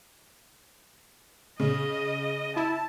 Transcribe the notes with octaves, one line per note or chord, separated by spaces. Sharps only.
C#3 D#5
E4 A5